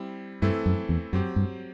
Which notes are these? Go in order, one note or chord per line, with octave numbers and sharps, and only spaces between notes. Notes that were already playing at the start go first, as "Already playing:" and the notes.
Already playing: G3 C4 E4
G2 E3 A3 C4 E4 A4
F#2
E2
F#2 F#3 C4 G4
G2